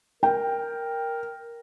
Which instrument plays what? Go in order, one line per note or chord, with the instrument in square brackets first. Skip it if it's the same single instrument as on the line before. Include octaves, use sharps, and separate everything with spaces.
[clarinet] A#4 [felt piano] G5